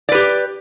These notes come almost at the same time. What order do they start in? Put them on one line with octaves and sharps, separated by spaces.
D5 B4 G4